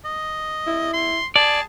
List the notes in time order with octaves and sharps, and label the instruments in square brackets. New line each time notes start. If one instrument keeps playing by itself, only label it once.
[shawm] D#5
[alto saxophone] E4
[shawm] C6
[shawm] G#4 [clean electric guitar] D5 [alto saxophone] A5